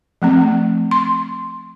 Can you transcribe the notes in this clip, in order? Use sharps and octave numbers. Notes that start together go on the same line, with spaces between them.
F3 A3 C4
C6